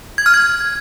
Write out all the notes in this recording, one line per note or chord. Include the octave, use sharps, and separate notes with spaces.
G#6
F6
G#6